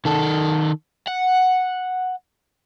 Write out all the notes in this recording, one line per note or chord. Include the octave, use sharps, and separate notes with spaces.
D#3 A4
F#5